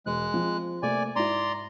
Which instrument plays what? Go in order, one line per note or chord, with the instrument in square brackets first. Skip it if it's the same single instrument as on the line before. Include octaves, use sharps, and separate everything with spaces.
[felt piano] E1 [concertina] G#3 F#6
[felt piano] F3 C4
[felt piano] C3 A3 A#3 [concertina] D5 G#5
[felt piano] G#2 E4 [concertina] D5 A#5 C6